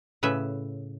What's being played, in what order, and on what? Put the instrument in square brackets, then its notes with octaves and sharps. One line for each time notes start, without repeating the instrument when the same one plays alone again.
[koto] A2 C#3 B4 E5